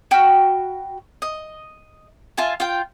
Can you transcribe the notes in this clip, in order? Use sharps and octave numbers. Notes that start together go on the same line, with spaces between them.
F#4 G5 B5 F6
D#5
F4 E5 G#5 A5
F4 G5